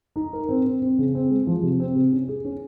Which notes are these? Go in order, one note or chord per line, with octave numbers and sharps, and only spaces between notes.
D#4
A#4
C4
C4
C4
C#3
C4
G#3
F3
C3
C4
C3
C#4
G#4
C#4